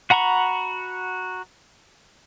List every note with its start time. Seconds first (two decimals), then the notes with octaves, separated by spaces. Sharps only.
0.10 F#4 F#5 A#5 B5 C#6